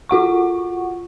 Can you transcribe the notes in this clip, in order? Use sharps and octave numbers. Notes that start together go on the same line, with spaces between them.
F4 F#4 F#5 C#6